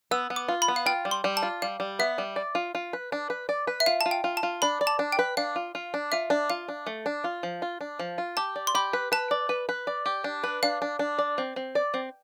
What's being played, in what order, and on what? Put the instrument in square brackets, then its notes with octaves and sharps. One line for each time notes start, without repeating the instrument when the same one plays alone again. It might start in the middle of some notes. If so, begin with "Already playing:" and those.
[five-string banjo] B3 [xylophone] E6
[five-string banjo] B3
[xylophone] D6
[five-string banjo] F4
[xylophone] B5
[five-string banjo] B3
[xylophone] F5
[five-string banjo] F4 [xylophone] G5
[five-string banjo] G3
[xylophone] C6
[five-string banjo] G3
[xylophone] A5
[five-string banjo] F4
[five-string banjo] G3 [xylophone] F5
[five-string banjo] G3
[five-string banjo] B3 [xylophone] E5
[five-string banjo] G3
D5
F4
F4
B4
D4
B4
D5
B4
[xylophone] E5
[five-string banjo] F4 [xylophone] F5
[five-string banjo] F4 [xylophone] A5
[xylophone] G5
[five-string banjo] F4
[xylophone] A5
[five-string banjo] F4
[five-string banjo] D4 [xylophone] B5
[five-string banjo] D5
[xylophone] A5
[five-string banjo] D4
[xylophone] G5
[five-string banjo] B4
[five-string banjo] D4 [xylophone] F5
[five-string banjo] F4
F4
D4
[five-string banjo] F4 [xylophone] E5
[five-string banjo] D4
[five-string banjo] F4 [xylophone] F5
[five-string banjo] D4
A3
D4
F4
F3
F4
D4
F3
F4
[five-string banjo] G4 [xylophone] A5
[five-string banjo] D5
[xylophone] C6
[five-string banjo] G4 [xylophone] B5
[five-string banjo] B4
[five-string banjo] B4 [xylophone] A5
[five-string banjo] D5
B4
B4
D5
G4
D4
B4
[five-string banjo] D4 [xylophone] F5
[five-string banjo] D4
D4
D5
C4
C4
D5
C4